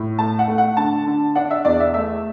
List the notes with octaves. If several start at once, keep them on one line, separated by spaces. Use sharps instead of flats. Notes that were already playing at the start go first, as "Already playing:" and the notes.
Already playing: A2
A3 A5
F#5
A3
F#5
D3 A5
D3
D4 F#5
E5
E2 D5
E5
A3 E5